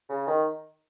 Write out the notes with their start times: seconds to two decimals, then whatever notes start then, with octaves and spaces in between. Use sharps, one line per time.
0.09 C#3
0.27 D#3